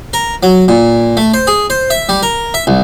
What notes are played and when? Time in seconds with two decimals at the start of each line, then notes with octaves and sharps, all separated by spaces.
0.13 A#4
0.43 F#3
0.68 A#2
1.17 A3
1.34 C5
1.47 G#4
1.70 C5
1.90 E5
2.09 G3
2.23 A#4
2.54 E5
2.67 C2